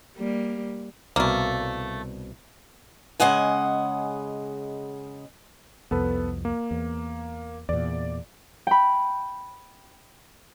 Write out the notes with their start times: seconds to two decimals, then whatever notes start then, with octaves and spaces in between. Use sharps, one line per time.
0.17 G3 A#3
1.16 C2 B2 A3 A#3
3.20 C#3 G#3 D#5 F#5 G#5
5.91 C2 F2 B3 A4 B4
6.45 A#3
6.71 E2
7.69 E2 A#2 D5
8.67 G5 B5